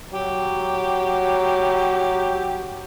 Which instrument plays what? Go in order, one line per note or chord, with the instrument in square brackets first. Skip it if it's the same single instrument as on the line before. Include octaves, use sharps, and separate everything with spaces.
[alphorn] F#3 [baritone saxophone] G4